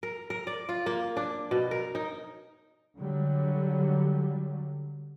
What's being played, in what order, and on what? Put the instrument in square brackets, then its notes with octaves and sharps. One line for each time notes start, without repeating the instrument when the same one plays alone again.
[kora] A#4
A#4
D5
F4
A#3
D4
B2
A#4
D#4
[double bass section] D3 F#3 G3